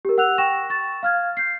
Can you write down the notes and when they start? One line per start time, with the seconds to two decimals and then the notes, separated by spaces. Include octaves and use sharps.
0.05 G4 A#4
0.18 F#5 E6 F#6 F7
0.38 G5 C#6 A#6 E7
0.70 C#6 A6
1.03 F5 F6 G#6
1.37 G6 C7